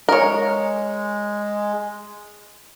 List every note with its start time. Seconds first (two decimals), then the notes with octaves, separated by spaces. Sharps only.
0.09 G#3 A#4 C#5